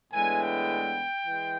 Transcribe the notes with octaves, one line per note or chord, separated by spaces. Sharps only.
A2 E3 G#3 B3 D4 G#5
G5
E3 G#3